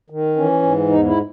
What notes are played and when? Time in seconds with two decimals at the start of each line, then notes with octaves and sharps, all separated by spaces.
0.10 D#3
0.36 E3 C#4
0.62 G#2
0.89 E2 D#4
1.06 E4